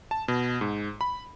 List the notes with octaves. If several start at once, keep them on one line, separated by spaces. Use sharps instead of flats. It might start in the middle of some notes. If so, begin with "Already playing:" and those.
A5
B2
G#2
B5